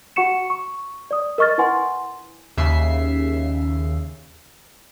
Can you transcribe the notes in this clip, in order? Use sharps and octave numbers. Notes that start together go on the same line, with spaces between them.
F#4 F#5 C#6 C#7 E7
C#6
D5 D#6
A#4 D#5 C#6 F6 A6
E4 B4 F#5 G#5 C6
D#2 C#3 E5 C7